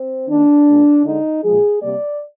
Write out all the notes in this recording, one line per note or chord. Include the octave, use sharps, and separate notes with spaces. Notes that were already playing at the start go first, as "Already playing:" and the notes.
Already playing: C4
D#3 A#3 D4
A#2 G#3
D3 G#3 D#4
A#2 F3 G#3 G#4
C3 G3 A#3 D5